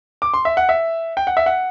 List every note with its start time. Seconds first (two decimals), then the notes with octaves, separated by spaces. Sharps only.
0.22 D6
0.34 C6
0.45 E5
0.57 F#5
0.69 E5
1.17 G5
1.27 F#5
1.37 E5
1.46 F#5